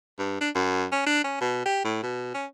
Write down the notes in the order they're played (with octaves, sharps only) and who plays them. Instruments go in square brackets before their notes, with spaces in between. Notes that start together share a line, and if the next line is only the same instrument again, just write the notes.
[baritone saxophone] G2
D4
F#2
C#4
D4
C#4
B2
G4
A2
B2
C#4